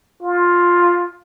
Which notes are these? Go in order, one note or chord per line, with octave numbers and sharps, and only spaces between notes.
F4